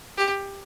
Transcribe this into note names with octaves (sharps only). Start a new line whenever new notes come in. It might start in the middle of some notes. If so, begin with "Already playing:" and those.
G4